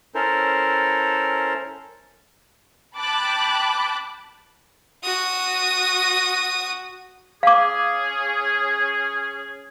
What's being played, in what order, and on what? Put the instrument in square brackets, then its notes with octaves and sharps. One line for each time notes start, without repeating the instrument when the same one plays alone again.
[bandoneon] C#4 E4 A4 A#4 C5
[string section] G5 A5 B5 D6 F#6
[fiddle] F#4 D#6
[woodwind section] C#4 G#4 [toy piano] F5 D6